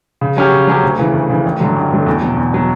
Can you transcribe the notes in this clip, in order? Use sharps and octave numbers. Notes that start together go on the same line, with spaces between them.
C#3
F#3 C#4 G4
C#3
F#3 C#4 G4
D2
C#3 E3
D2
C#3 E3
A1
G2 D3 F#3 A3
A1
G2 D3 F#3 A3
E2
B2 F#3
E2
B2 F#3